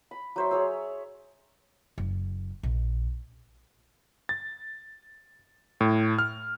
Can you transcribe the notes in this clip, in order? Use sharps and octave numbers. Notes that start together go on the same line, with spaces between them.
B5
F#3 C5 E5
G#4 C#5 E6
F#1
A#1
A6
A2
F6